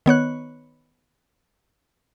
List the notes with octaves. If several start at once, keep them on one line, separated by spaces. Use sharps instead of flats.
D#3 B3 C#5 F#6